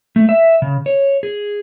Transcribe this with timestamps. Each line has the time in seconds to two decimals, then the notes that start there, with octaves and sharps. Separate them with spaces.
0.16 A3
0.29 E5
0.62 C#3
0.86 C#5
1.23 G#4